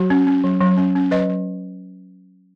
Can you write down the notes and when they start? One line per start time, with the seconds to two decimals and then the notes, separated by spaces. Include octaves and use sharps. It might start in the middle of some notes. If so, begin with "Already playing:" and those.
Already playing: F#3 F#4
0.10 C#4
0.27 C#4
0.44 F#3
0.61 F#3
0.77 C#4
0.95 C#4
1.11 F#3 B4 D#5
1.29 F#3